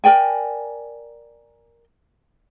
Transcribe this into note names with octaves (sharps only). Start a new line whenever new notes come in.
A#4 D5 G5 G#5